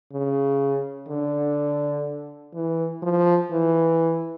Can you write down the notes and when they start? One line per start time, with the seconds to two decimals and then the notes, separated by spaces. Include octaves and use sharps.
0.12 C#3
1.08 D3
2.54 E3
3.02 F3
3.51 E3